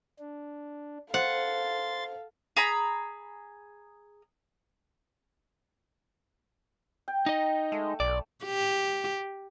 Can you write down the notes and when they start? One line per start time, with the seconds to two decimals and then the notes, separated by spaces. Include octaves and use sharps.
0.19 D4
1.14 A4 C5 F5 F#5 C6 A6
2.56 G#4 A#5 B5
7.08 G5
7.26 D#4 D#5
7.72 G#3 A3
8.00 B1 D5
8.44 G4